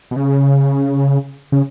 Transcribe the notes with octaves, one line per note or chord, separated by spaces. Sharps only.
B2
C#3
C#3